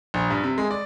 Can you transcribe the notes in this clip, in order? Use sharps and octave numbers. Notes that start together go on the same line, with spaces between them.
A#1
G2
C3
G#3
D5